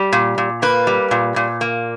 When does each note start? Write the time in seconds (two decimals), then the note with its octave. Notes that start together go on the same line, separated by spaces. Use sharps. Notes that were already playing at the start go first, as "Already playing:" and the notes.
Already playing: G3
0.13 A#2
0.38 A#2
0.62 A#3 B4
0.87 G3
1.11 A#2
1.36 A#2
1.61 A#3